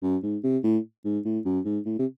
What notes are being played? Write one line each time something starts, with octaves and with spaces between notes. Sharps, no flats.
F#2
G#2
C3
A2
G#2
A2
F#2
G#2
A2
C3